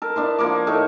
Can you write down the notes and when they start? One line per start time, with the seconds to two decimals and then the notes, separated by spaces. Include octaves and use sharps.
0.02 A4 A#4
0.16 B3 D4 E4 C5
0.38 F3 A#3 F#5 D6
0.67 A2 A3 D#4 C#6